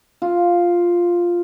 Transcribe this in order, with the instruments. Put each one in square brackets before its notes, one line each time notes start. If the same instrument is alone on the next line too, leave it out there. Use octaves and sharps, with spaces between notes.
[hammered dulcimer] F4